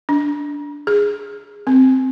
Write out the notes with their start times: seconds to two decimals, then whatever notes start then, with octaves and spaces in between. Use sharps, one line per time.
0.09 D4
0.87 G#4
1.67 C4